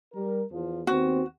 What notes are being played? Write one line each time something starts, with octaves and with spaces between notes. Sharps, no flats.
G3 A#4
E2 F3
D#2 B3 C4 F#4